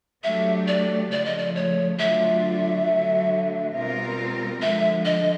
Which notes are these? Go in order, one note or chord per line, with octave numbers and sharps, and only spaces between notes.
F#3 A3 D4 G4 E5
D5
C#3 F3 A3 D5
D#5
D5
C#5
D3 F#3 A3 D4 F4 E5
D3 F#3 A3
B2 G3 C4 F4 A#4
D3 F3 G#3 E5
D#5